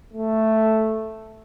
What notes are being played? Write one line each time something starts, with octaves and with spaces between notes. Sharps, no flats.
A3